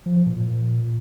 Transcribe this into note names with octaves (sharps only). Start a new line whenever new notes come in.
F3
F3
A#2
A#2